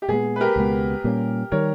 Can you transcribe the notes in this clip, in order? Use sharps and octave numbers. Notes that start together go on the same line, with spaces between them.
G4
A#2 G#3 B3 G#4
B4
G4 A#4
C#2 B2 G#3 B3
A#2 G3 A#3 C#4
D#3 G3 A#4 C#5